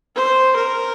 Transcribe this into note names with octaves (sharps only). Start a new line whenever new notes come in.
C5
A#4